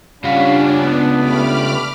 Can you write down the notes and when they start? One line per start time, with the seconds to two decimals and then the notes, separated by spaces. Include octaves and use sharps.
0.24 C#3 G3 C#4 D4 F4 F5 F#5 B5
0.80 B3
1.17 E2 G2 A3 B5 D6 F6